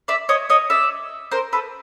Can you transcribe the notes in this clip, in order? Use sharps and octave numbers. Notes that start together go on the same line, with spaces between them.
D5 E5
C#5 D#5
C#5 D#5
D5 E5
A#4 C5
A4 B4